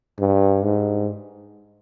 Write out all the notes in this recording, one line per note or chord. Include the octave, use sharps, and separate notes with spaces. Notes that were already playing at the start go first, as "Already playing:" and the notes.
G2
G#2